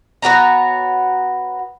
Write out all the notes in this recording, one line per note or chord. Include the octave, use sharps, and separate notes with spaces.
B3 F#4 C#5 A#5